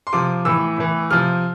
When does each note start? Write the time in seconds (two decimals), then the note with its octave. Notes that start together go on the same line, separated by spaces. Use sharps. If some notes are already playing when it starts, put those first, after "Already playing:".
0.07 C6
0.13 C3 F3 D6
0.45 A2 E3 E6
0.78 A2 E3
1.11 C3 F3 F6